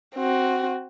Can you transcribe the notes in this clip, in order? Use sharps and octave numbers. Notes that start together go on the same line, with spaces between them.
C4 F#4